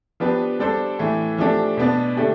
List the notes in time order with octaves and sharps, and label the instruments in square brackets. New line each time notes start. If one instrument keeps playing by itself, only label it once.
[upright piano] F3 B3 D4 G4 B4
G3 D4 A4 C5
A2 E3 A3
F3 A3 D4 G4
B2 B3 D4
D3 A3 D4 G4